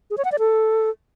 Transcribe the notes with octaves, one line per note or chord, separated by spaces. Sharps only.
G#4
C#5
F#5
D5
A4